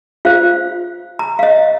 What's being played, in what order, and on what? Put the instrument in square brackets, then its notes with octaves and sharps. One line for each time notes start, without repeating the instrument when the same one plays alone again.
[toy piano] F4 C5 F5
A#5
F5
D#5